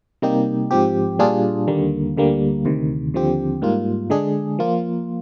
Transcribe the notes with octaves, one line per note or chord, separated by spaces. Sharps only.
C3 G3 A#3 D#4 G4
G#2 F3 C4 G4
A#2 G3 D4 F4 G#4
D#2 D3 G3 A#3
D2 D3 G3 A#3
D2 C3 D#3
D#2 D3 F3 C4 G4
G#2 G3 A#3 F4
D3 G#3 D4 G#4
F3 A#3 F4